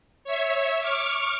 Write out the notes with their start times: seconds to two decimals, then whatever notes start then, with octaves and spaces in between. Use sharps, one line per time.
0.24 C#5 E5
0.80 C#6 D6 F6